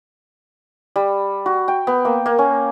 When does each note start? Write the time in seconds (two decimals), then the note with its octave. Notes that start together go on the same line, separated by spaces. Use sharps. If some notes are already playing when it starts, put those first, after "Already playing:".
0.96 G3
1.46 F#4
1.68 G5
1.87 B3
2.05 A#3
2.26 A#3
2.39 C#4